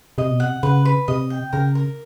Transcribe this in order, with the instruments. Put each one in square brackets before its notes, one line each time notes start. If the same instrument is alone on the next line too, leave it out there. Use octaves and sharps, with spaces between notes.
[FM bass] C3 [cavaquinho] D#5
[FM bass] B2
[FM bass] C3 [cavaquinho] F#5
[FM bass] C#3 [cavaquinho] B4
[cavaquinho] B4
[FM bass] C3 [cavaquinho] D#5
[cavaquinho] G5
[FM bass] C#3 [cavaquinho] A#4
[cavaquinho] A#4